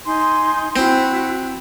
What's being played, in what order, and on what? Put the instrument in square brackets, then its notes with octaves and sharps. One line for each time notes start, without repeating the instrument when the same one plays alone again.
[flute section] D#4 G#5 C6
[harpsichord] C4 [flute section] E4 F#4